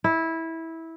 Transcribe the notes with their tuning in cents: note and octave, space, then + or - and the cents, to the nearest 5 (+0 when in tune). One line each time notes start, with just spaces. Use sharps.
E4 -15